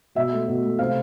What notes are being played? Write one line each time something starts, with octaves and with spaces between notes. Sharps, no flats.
B2 E5
A3
B2
A3
C3 F5